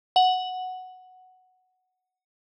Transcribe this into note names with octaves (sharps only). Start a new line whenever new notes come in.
F#5 F#7